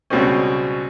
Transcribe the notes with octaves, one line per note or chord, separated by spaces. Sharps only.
C#2 B2 G3 C4 C#4